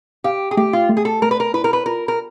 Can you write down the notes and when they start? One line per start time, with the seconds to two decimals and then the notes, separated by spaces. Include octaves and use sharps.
0.24 G4 F5
0.51 G#4
0.57 A3 G4
0.73 F4
0.89 A3
0.97 G#4
1.05 A4
1.22 A3 A#4
1.31 B4
1.40 A#4
1.54 E4 B4
1.64 A#4
1.73 B4
1.86 F4 A#4
2.08 A#4